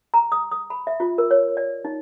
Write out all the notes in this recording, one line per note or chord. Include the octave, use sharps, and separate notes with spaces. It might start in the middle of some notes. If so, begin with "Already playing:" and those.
A#5
D#6
D#6
B5
E5
F4
A#4
C#5
D5
D#4